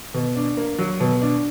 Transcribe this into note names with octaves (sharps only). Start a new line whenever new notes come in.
B2
D4
A#3
F#3
B2
D4